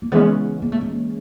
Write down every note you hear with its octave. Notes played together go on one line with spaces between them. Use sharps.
A#3
C#3 E3 G#3 B3 C#4
A#3
A3
A#3